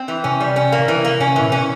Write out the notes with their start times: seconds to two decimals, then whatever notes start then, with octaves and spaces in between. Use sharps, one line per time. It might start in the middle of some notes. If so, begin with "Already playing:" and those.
Already playing: C4
0.08 E3
0.24 C3 C#4
0.41 G3
0.56 C#4
0.72 A#3
0.79 C#3
0.88 C3 E3
1.04 A#3
1.20 C3 C#4
1.36 A#2 E3
1.52 B2 C#4